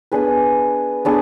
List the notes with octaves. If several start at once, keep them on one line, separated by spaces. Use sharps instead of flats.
B3 D4 G#4 B4
B3 D4 G#4